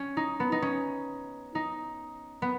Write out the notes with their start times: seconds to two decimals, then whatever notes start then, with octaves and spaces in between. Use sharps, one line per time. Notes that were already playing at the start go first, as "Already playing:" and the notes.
Already playing: C#4
0.17 D#4
0.40 B3
0.52 D#4
0.62 C#4
1.55 D#4
2.42 B3